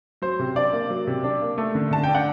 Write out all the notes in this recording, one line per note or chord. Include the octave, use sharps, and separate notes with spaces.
F#3 C5
C3
D4 D5
A#3
F#3
C3
D4
A#3
A3
D3
D3 A5
D4 G5
F#5